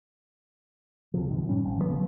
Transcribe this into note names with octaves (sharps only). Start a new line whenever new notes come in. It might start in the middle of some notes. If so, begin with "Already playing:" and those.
C#2 C3 F3
A#1 F#2 D#3
A2 G3 C#4
G#1
D#3 F#3 G#3 B3
C#3 F3 F#3 B3